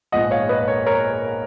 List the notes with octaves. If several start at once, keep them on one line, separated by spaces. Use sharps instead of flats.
A#1 G#2 F3 D#5 F#5
C#5 F5
B4 D#5
A#4 C#5
A#4 C#5